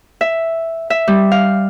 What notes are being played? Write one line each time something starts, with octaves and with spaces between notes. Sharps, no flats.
E5
E5
G3
F5